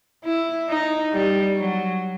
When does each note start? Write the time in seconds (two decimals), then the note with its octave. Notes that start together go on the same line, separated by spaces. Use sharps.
0.24 E4
0.68 D#4
1.13 G3
1.57 F#3